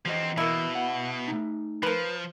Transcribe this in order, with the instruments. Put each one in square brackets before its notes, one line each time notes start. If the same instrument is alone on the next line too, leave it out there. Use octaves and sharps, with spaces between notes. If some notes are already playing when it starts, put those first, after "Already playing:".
[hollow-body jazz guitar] E3 F#4 D#5 [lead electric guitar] F3 C4
[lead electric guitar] B2 [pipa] A#3 E4
[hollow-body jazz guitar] F#5
A3 D#4
[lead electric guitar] F3 [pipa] A#4 B4